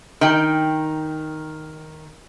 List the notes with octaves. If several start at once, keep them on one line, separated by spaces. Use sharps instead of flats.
D#3 G5